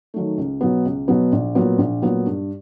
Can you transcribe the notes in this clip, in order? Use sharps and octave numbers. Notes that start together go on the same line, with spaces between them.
D#3 F#3 A3
C#2
B2 F#3 B3
C#2
B2 F#3 B3
A#1
A#2 F#3 B3
A#1
A#2 F#3 B3
G2